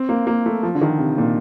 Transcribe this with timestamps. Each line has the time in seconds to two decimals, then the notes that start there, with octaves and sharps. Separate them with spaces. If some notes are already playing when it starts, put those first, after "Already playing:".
Already playing: C4
0.09 A#3
0.27 A#3
0.46 A3
0.63 F3
0.75 D3
0.82 D#3
0.99 C3
1.18 A#2